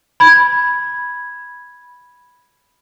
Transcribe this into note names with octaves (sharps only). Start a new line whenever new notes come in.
B5 G#6